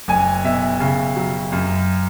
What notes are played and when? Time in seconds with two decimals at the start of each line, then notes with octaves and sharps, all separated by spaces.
0.08 F#1 G#5
0.44 B2 E5
0.80 C#3
1.16 F#3
1.52 F#2